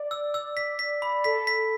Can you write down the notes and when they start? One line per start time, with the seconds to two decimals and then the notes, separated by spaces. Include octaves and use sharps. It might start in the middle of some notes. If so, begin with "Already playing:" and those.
Already playing: D5
0.11 E6
0.34 E6
0.57 B6
0.79 B6
1.02 B5
1.24 A4 B6
1.47 B6